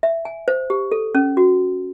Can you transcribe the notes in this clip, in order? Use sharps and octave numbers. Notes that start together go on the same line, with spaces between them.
E5
G#5
C5
G4
A4
C#4
F#4